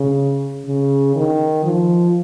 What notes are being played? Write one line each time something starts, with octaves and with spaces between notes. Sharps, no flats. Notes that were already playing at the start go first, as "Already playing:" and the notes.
Already playing: C#3
C#3
D#3
F3